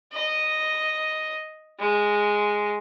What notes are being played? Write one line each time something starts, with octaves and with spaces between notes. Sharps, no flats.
D#5
G#3